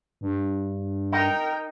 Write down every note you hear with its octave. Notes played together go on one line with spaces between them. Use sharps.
G2
D#4 A#4 G5